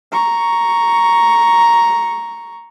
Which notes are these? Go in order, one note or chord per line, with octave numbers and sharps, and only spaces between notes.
A#5 C#6